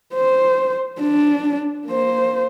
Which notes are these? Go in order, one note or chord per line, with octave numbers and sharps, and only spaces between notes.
C5
D4
A#3 C5